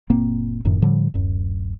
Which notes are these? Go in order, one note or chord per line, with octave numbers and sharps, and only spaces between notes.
F#1 A#2 A#3 C4
F1 F#2 A2 D#3
A2 D3 F3 G3
D1 F#2